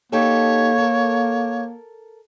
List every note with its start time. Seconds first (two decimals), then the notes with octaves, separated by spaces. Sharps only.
0.12 A#3 D#4 G4 A4 C#5
0.78 A4 A#4